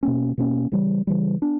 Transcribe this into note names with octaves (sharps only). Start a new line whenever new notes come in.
B2 A#3 C#4
B2 A#3 C#4
C#3 E3 G3
C#3 E3 G3
B3 D4